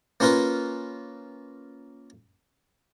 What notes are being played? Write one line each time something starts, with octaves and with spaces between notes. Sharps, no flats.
A#3 C#4 F4 A#4 B4